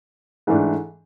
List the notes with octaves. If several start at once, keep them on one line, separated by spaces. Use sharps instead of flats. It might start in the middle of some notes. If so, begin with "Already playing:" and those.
G#2 E3 A3 D4